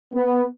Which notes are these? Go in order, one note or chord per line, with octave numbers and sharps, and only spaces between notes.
B3